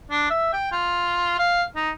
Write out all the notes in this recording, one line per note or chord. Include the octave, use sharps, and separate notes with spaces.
D4
E5
G5
F4
F5
D#4